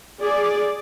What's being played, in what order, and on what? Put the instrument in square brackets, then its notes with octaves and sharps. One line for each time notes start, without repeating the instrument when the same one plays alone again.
[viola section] G#4 D5